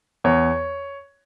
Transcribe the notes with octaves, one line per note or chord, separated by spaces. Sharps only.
E2 C#5